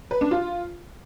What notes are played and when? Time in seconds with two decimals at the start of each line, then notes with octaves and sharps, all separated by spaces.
0.11 B4
0.21 D4
0.31 F4